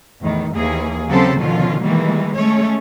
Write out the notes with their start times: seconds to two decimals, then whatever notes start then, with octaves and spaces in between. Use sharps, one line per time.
0.23 E2 A2 D#3
0.54 D#2 E3 A#3 G#4
1.09 C#3 F#3 C4 G4 A4 C5
1.39 B2 D3 D#3 F3 C#4 F4
1.84 D#3 E3 G3 G#3 A#3
2.37 G#3 A3 C#4 C#5